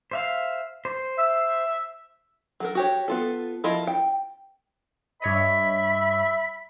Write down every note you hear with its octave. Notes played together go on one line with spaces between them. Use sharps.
C5 E5 F5
C5
E5
F#3 A4 A#4
F#4 G4 C#5
B3 F4 A4
F3 E4 F4 A#4 D#5
G5
G2 C#5 D#5 E5 B5